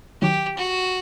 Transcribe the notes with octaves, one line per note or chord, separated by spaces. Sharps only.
D#3 F#3 G4
F#4